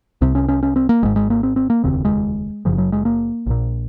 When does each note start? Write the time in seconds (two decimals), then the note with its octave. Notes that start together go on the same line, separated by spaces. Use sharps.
0.21 C2 C3 C4
0.35 C#4
0.48 C#4
0.63 C#4
0.76 C4
0.89 A#3
1.03 G#1 G#2 G#3
1.16 G#3
1.30 A#3
1.43 C4
1.56 C4
1.70 A#3
1.84 F1 D#2 C#3 C4
2.05 G#3
2.65 F#1 F#2 C#3 F3
2.78 F#3
2.92 G#3
3.05 A#3
3.47 A#1 A#2